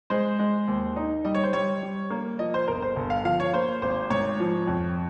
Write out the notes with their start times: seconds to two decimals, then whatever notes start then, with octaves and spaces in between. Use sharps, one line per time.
0.10 G#3 C5
0.39 G#3
0.68 D#2
0.96 D#4
1.25 G3 D#5
1.35 C#5
1.44 C5
1.53 G3 C#5
1.82 G3
2.10 A#3
2.39 F3 D#5
2.54 C5
2.68 G1 A#4
2.82 C5
2.96 G1
3.10 F5
3.24 F3 F5
3.40 C#5
3.53 A#3 C5
3.82 G#1 C5
4.10 G#2 C#5
4.40 F3
4.67 F2